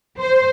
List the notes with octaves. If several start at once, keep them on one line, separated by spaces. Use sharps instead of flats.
C5